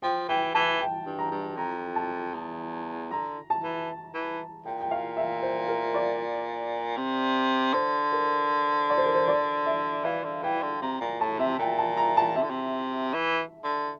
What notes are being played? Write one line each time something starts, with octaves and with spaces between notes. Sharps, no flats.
F3 G5
E3 G5
E3 A5
G5
G2
A#5
G2
F2 A#5
A5
E2
D3 A#5
A5
E3
E3
A#2 G5
G5
F5
E5
C5
A#4
D5
C3
D3 C5
A#4
D5
C5
A#4
C5
D5
E5
E3 F5
D3
E3 G5
D3
C3 A#5
A#2 A#5
A2 A5
C3 E5
A#2 G5
A5
A#5
A5
C3 E5
D3
C3
E3
D3